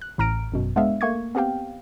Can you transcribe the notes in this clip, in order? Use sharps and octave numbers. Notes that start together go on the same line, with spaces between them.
F#6
A1 A2 A#5 F6 A#6 D7
G#1 F#2 B2
G#3 B3 D4 E5 F5
A3 A#3 C#6 G#6
B3 C4 G4 F5 G5